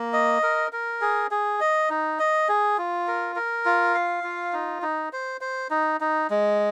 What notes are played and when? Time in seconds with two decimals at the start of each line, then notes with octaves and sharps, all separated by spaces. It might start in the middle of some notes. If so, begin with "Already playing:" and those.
Already playing: A#3
0.13 D#5
0.43 A#4
0.73 A#4
1.01 G#4
1.31 G#4
1.60 D#5
1.90 D#4
2.19 D#5
2.49 G#4
2.78 F4
3.08 A#4
3.36 A#4
3.65 F4
3.94 F5
4.24 F4
4.53 D#4
4.82 D#4
5.13 C5
5.41 C5
5.71 D#4
6.01 D#4
6.30 G#3